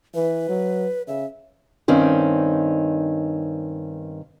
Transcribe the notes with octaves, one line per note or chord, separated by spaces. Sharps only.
E3 B4
F#3
C#3 E5
G2 D#3 C4 C#4